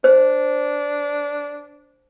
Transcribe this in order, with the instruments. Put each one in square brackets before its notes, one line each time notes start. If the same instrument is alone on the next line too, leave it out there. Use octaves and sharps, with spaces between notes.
[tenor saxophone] D4 [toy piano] C5